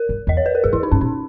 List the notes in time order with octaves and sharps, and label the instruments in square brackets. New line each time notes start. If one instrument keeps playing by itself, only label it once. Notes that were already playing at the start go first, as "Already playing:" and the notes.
Already playing: [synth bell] A#4
[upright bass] G2
[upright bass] E2 [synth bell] D#5
[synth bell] C#5
B4
A#4
[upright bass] G2 [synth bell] G#4
[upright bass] E2 [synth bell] E4
[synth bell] D#4
[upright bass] G2 [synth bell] C#4
[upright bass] A#2 [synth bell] D#4